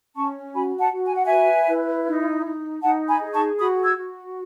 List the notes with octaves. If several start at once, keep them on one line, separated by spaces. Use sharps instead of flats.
C#4 A5 C#6
F#4 G#5 B5
F#5 A5
F#4
G#5
F#5
E5 G#5
B4
E4
D#4
D#4
D#4 F#5 A5
G#5 B5
G#4
A5 C#6
F#4 B5 D#6
E6 G#6
F#4